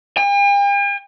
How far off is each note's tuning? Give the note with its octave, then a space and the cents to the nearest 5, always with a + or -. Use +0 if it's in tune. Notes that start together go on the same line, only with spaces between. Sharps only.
G5 +45